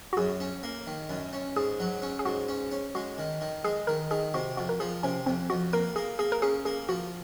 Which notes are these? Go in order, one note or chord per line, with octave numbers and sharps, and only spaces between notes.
F#4
F#2 G#4
C#4
A#3
D#3
F#2
C#4
G#2 G#4
F#3
C#4
G#4
G#2 F#4
C#4
C#4
G#3 F#4
D#3
D#3
G#3 G#4
D#3 A#4
D#3 G#4
C3 F#4
F2 F#4
A#4
F3 G#4
C3 C#4
F2 C4
F2 F#4
A#3 A#4
A#3 G#4
A#3 G#4
A#4
C#4 G#4
A#3 G#4
F3 F#4